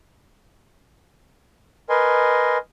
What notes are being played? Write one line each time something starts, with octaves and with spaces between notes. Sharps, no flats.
A#4 B4 D#5 G#5 C6